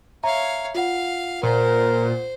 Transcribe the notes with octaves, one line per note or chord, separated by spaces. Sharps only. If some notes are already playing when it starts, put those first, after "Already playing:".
C#5 E5 F5 A#5
F4 F5 F#5
A#2 A#4 C5